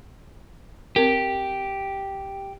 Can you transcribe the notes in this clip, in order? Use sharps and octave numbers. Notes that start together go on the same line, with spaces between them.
C4 G4 A#4